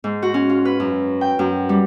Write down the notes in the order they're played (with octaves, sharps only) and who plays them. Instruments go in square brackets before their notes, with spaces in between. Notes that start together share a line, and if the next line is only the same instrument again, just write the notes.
[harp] G#2
F#4
C#4
F4
B4
F#2
G5
F#2
G3